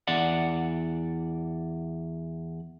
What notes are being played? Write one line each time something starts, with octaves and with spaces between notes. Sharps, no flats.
E2 D5 F#5